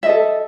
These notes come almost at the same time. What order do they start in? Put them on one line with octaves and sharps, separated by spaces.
E5 D#5 A4